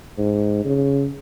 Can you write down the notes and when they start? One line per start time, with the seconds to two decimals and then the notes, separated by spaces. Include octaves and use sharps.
0.18 G#2
0.65 C#3